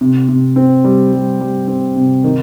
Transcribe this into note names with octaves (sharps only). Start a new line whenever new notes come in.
C3
C3
C4
G3
G3
G3
C4
C3
D#3